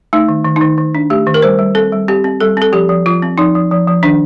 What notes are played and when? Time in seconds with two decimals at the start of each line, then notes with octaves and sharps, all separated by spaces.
0.13 A3 D#4
0.28 D#3
0.45 D#3
0.56 D#3 D#4
0.78 D#3
0.95 D4
1.10 A3 G4
1.26 D#3
1.34 A#4
1.42 G3 C5
1.59 G3
1.75 C4 A4
1.92 G3
2.08 C4 G4
2.24 C4
2.40 G3 A4
2.57 C4 A4
2.72 F3 G4
2.89 F3
3.06 F3 F4
3.22 C4
3.38 F3 D#4
3.55 F3
3.71 F3
3.88 F3
4.03 D#3 D4